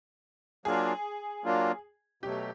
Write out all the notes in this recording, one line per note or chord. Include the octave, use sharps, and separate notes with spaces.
F#3 A#3 D4 F4 G#4
F#3 A#3 D4 F4
B2 F#3 A3 G4